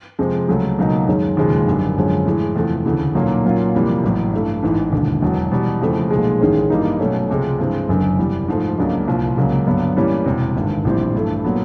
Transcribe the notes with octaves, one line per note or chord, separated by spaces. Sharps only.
F2 C3 F3 G#3 C4
C#2 C#3 F#3 A3
C#2 B2 F#3 A#3 D#4
F#2 D#3 G#3 C#4
E1 D#2 C#3 F3 G#3
G#1 F#2 D3 G3
F#2 D3 F3 G#3 C#4
A2 E3 G#3
E2 C3 F3 A3
D2 C#3 E3 A3
B1 A#2 F#3 A#3 C#4
A#2 F#3 A#3 C#4 F4
F2 C3 E3 G3 A#3
A1 A2 F#3
G2 E3 A3
A1 G#2 E3
E1 D#2 D3
E1 E2 B2 F#3
E2 B2 G3
F2 C#3 E3 A3 C4
B1 A#2 F3 G#3
A1 G#2 D#3 G#3 C#4
G2 E3 G3 A#3 D#4
B2 F#3 A3 C#4
C#2 C3 F3 G#3
G2 E3 G#3 C4
F#1 F#2 D3
E2 C3 E3 G3
G#2 F3 A3
C#2 C#3 F#3 A#3 D4
C2 A#2 F3
C#2 C#3 F#3 A#3
G2 D3 F#3 B3 D4
A2 E3 G3 A#3 C#4
E1 E2 C3
G#1 G2 D3
A#1 A2 E3 G3 C4
G2 E3 A3
A#2 F#3 B3